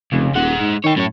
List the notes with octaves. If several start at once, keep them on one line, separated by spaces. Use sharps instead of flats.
F1 C#2
D#1 G#3 F#5
G#2
D#3 C#5 G5
F#2 A2 C#5